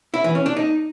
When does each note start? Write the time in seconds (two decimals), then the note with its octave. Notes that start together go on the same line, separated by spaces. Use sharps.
0.14 E4
0.24 E3
0.35 C#4
0.46 D4
0.56 D#4